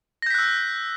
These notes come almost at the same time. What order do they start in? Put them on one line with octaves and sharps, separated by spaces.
A#6 G6 B6 F#6 E6